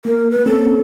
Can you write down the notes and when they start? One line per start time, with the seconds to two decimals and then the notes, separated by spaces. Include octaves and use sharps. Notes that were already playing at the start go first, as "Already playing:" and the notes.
0.05 A#3 A#4
0.31 B4
0.46 A#3 C4 C#4 A4